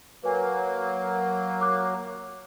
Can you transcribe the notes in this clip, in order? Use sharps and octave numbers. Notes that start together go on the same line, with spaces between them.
F#3 A#3 B4 G#5
D6 F#6